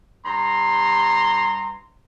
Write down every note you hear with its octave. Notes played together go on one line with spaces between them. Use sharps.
G2 A#5 C6